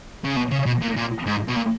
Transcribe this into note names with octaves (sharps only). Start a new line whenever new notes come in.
C#3
B2
C#3
B2
A#2
A#2
G#2
B2
A#2